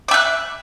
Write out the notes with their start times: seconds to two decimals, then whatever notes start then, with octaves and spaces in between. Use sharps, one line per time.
0.08 D6
0.11 E5
0.14 F#6